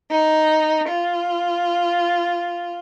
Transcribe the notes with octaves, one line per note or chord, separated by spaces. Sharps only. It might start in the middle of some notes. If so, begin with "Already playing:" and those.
D#4
F4